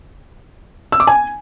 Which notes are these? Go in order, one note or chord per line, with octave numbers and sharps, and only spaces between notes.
E6
D6
G#5